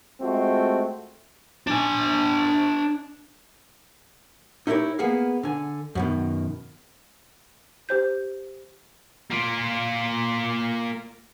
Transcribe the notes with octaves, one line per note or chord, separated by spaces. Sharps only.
G#3 A3 C4 F4 F#4
D4 G#5
D#4 E4 G4 A#4 C#5
A#3 B3 G#4 F5
D3 G#5
F#2 B2 D#3
G4 C5 G6
A#3 F4